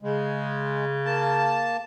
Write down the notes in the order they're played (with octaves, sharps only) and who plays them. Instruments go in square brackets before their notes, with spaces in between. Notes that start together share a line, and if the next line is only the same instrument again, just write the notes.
[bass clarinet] C#3 [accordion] G#3
[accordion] A#3 A5